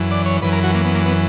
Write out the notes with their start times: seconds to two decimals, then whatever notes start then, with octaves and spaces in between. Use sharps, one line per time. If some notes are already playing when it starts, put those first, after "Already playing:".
Already playing: F#2 E3
0.11 D5
0.26 C#5
0.42 F#2 E3 B4
0.53 A#4
0.64 F#4
0.75 A#3
0.85 B3
0.95 A#3
1.06 B3